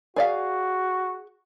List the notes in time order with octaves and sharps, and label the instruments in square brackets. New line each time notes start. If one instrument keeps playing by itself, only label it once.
[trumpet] F#4 [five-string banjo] G#4 D5 F5